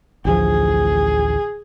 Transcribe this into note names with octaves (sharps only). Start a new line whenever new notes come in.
A1 D2 F3 G#4